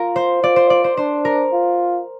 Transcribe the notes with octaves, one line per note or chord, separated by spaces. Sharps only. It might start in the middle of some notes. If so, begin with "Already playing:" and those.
Already playing: F4 A#4
C5
F4 D5
C5
D5
C5
D4 C5
A#4
F4